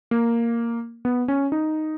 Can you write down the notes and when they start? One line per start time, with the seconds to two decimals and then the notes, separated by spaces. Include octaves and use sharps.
0.11 A#3
1.05 B3
1.28 C#4
1.52 D#4